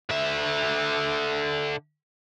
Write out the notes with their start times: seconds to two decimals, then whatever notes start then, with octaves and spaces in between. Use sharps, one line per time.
0.10 D3 E5